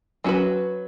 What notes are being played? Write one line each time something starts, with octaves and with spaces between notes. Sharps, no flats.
F#3 C#4 F#4 B4